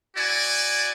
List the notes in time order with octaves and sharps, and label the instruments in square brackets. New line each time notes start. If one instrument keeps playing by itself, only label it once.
[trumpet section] E4 F#4 D5 G#5